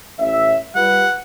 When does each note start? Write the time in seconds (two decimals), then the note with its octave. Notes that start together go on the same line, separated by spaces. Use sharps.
0.19 A1 E5
0.75 G3 F4 B4 F#5